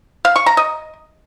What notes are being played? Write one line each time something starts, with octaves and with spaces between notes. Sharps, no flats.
F5
C#6
A#5
D#5